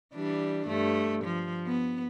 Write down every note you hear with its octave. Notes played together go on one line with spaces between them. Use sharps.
E3 G3 D4
G2 A3
F3
B3